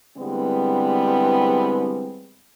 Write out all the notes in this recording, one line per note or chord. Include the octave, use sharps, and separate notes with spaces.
D3 E3 G3 G#3 B3 C4